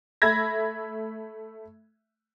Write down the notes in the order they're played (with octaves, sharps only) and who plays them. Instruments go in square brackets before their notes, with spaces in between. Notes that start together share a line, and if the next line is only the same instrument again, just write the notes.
[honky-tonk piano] A3 E5 B5 G#6 A#6